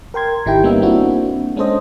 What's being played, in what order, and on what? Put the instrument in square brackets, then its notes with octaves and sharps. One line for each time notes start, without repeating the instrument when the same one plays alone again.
[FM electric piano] A#4 G5 C6 G#6
G#1 D#3 E4 G4 G5
G3 A#3 B3 C#4 D#4 E5
A#3 C4 D4 E4 F#4
G#3 C#4 D4 A4 C5 D#5